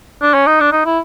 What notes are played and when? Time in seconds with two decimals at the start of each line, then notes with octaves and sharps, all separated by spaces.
0.22 D4
0.34 C#4
0.47 D#4
0.60 D4
0.72 D#4
0.86 E4